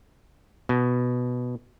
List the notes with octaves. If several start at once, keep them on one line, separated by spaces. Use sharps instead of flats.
B2